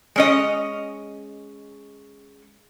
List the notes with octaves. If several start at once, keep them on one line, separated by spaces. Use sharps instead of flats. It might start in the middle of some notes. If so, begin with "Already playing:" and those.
G#3 C#4 D#5